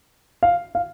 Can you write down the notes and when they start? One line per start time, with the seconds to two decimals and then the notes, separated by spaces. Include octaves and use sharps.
0.43 F5
0.75 F5